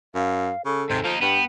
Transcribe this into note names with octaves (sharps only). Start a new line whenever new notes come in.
F#2 F5
C#3 A4
D#2 G#2 C3
F3 A#3 D#4
G2 B3 G5